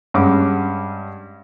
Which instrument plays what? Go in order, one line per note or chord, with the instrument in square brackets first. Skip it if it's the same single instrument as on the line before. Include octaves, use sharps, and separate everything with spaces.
[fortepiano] G2 G#3 C#4 F#5 D6